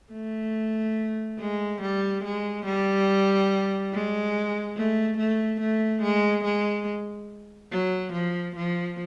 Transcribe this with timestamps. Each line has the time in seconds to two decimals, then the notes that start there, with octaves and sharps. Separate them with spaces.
0.12 A3
1.39 G#3
1.82 G3
2.24 G#3
2.66 G3
3.93 G#3
4.76 A3
5.18 A3
5.61 A3
6.03 G#3
6.44 G#3
7.71 F#3
8.13 F3
8.56 F3